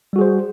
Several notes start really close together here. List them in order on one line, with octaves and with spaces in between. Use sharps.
G3 F#4 G#4 C5